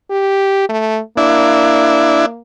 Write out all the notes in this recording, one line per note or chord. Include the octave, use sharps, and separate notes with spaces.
G4
A3
A#3 D4 E4